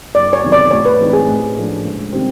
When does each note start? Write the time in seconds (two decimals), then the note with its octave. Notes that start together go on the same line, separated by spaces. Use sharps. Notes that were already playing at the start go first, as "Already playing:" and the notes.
0.15 F#1 D5
0.33 C#5
0.43 E2 C3 D#3 F#3
0.52 D5
0.71 A2 C#5
0.85 B4
0.99 E3 G#3 C4 D#4
1.13 G#4
1.28 A1
1.57 A2 F3 A3 D4
1.85 C#2
2.13 C3 D#3 G3 C4